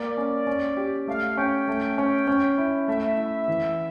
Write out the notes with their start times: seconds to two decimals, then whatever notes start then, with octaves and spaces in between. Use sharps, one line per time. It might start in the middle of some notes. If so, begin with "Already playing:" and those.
Already playing: A#3 D5
0.17 C#4
0.47 C#4
0.77 G4
1.08 A3 F5
1.37 C#4 G5
1.68 A3
1.98 C#4
2.28 C#4
2.58 E4
2.88 A3 E5
3.18 E4
3.48 E3